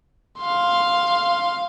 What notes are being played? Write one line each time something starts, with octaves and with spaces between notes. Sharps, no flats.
F5 C6